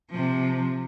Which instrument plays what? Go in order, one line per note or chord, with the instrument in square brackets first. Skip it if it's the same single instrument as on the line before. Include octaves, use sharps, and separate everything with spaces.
[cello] C3 F3